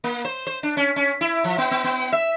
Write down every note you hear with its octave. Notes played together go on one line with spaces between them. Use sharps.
A#3
C5
C5
D4
C#4
C#4
E4
F3
B3
B3
B3
E5